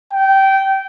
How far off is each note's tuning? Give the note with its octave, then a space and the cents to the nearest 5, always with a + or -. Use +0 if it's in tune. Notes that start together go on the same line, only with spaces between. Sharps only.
G5 -20